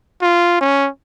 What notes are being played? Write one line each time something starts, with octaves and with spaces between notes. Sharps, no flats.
F4
C#4